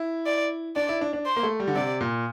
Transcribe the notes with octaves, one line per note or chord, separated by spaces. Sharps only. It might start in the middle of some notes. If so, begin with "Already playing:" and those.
Already playing: E4
D5
D4 D5
E4
D4
D4
C5
A#3
A3
G3
D3
C3 D5
A#2